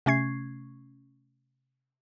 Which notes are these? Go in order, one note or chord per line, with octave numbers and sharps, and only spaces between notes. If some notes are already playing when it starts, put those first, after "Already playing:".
C3 A3 C#4 C#6 G#6 C7